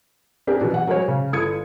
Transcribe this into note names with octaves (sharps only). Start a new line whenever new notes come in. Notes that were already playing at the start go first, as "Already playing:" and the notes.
C4 D4 G4 G#4 A#4
B2 E3 F#3
F#5
F#3 G#3 A#4 C5 C#5
C#3
G1 E4 A4 D#6 G#6 C#7